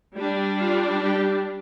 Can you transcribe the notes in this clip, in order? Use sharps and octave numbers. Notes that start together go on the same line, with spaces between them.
G3 D4
F4
G4